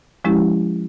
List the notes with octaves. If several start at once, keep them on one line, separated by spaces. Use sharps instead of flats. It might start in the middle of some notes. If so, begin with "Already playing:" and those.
F3 G#3 C#4 E4 G4